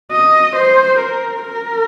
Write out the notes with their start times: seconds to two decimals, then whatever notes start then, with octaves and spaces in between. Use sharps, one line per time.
0.11 D#5
0.56 C5
0.99 A#4
1.42 A#4